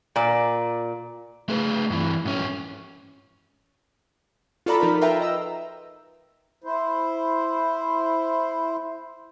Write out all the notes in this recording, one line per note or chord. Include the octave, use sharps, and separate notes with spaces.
A#2 D5
A3 G#4 B4
G2 E3
G#2 C#4
F4 F#4 A4 D5 A#5 B5
F3 D#4 A#4 B5
F4 B4 E5 G5 A#5
D#5 A#5 E6
E4 C5